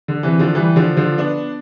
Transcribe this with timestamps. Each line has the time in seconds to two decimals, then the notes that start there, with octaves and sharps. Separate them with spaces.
0.08 D3
0.23 C3 E3
0.39 D3 F3
0.55 E3 G3
0.76 D3 F3
0.97 D3 F3
1.18 B3 D4